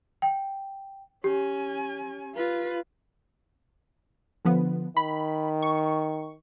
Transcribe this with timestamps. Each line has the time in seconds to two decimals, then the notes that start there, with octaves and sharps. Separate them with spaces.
0.22 G5
1.24 C#4 G4 G#5
2.35 F4 B4
4.45 D3 F3 B3
4.97 D#3 B5
5.62 C#6